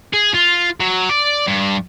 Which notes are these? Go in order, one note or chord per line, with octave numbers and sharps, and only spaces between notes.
G#4
F4
F#3
D5
G2